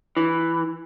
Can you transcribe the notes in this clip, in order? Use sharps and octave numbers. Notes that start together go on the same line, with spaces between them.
E3